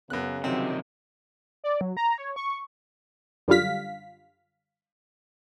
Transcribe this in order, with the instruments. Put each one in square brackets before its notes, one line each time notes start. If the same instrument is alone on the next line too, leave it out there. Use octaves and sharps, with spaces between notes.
[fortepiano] F#2 F#6 [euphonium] C#3 [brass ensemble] B3
[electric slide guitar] C3 D#3 [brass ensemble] F3 F#3 [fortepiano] C4
[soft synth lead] D5
F#3
A#5
C#5
C#6
[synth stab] F#2 D3 G3 F4 F5 B6